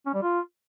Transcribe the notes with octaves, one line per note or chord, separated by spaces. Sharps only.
C#4
G3
F4